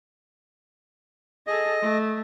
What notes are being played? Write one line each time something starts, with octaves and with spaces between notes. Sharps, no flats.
G#4 A4 D#5
A3